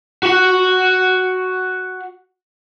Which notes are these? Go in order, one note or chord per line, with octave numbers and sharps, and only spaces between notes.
F#4 F#5